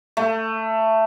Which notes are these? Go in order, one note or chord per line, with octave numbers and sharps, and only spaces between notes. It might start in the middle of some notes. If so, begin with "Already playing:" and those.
A3